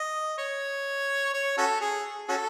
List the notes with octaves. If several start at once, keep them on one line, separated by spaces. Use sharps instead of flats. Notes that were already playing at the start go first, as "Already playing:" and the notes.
Already playing: D#5
C#5
C#5
C#4 F#4 A4
G#4
C#4 F#4 A4